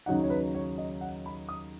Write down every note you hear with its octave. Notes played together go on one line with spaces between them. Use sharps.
D#2 C#3 F#3 D#4 F#5
C#5
B4
C#5
D#5
F#5
B5
D#6